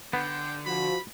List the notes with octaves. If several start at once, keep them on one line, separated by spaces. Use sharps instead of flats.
D3 B3 G5
F3 F#4 B5